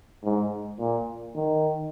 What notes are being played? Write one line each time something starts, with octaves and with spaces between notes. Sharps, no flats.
G#2
A#2
D#3